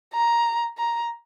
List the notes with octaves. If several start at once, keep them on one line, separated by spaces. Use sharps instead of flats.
A#5
A#5